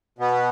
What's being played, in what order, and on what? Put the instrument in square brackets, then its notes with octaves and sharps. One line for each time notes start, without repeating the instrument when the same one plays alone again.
[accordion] B2 B3